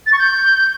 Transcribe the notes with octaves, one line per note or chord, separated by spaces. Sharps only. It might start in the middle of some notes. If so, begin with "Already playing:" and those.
A6
C#6
G6